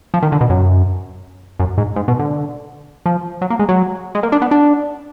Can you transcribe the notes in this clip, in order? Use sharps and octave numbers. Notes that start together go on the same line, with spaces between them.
F3
D#3
D3
B2
F#2
F#2
G#2
G#2
B2
D3
F3
F#3
A#3
G#3
F#3
G#3
A#3
D4
B3
D4